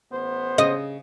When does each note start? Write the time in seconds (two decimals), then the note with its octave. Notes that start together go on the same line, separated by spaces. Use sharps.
0.12 A1 B3 C5
0.58 C#3 D#5